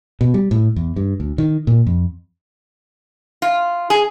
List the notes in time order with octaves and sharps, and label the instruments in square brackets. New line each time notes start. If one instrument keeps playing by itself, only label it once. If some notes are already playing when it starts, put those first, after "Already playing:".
[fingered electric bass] B2
G3
A2
E2
G2
D2
D#3
A#2
F2
[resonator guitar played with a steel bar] F4
G#4